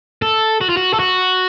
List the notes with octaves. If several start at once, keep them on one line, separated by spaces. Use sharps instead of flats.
A4
F#4
F4
F#4
A4
F#4